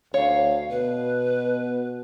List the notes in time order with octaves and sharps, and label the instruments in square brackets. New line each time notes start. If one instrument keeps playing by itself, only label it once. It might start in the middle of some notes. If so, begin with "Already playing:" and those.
[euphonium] D2 [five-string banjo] C#5 [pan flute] F5
[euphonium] B2 [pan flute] B4